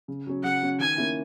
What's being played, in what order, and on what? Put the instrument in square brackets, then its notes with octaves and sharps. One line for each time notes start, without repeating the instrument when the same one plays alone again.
[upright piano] C#3
F#3 C#4
[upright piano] C#3 [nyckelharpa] F#5
[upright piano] F#3 C#4
[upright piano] D#3 [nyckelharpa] G#5
[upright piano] A#3 C#4 E4